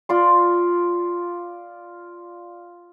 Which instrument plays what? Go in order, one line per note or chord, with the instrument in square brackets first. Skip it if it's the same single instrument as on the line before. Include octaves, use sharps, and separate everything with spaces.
[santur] F4 D5 C6